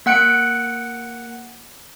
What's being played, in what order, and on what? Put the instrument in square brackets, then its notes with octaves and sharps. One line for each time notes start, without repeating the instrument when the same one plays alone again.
[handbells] A#3 F#5 F#6 C#7 D7